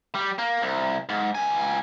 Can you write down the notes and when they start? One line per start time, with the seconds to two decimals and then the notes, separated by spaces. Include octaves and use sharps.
0.15 G3
0.39 A#3
0.62 C2
1.09 G#2
1.35 C#2 G#5